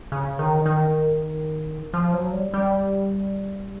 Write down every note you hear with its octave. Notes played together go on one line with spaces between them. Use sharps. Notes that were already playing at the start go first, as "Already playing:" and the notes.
C#3
D#3
D#3
F3
F#3
G3
G3